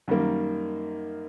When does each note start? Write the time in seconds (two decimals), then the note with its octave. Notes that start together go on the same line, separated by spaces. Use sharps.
0.08 F#2 D#3 G3 A#3